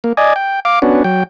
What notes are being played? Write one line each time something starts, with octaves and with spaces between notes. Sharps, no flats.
A#3
D5 D#5 G#5
G5
F5 D6
B3 C#4 D4 F#4
F#3 G5